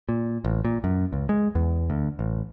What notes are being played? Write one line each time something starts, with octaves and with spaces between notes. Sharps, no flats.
A#2
A1
A#2
F#2
C#2
G#3
E2
D2
A1